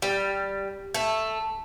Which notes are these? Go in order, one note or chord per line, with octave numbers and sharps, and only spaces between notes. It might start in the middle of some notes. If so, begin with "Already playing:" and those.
G3
A3